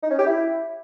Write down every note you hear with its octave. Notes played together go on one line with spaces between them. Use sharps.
D#4
C#4
G4
E4